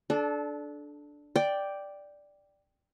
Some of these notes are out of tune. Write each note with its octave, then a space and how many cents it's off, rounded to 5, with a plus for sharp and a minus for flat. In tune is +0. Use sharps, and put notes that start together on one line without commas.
D4 +0 A4 -25
D5 +0 G5 +0